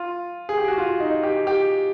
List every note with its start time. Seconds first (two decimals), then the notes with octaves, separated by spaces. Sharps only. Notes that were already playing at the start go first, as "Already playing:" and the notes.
Already playing: F4
0.49 G#4
0.58 G4
0.68 F#4
0.78 F4
1.00 D#4
1.23 G4
1.47 G4